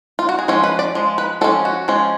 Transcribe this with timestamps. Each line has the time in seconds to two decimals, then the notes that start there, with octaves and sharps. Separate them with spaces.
0.19 F4
0.29 F#4
0.39 G#4
0.48 F3 G#3 C#4 A4
0.64 B4
0.79 D5
0.95 F3 G#3
1.18 B4
1.41 F3 G#3 C#4 A4
1.65 F#4
1.88 F3 G#3 C#4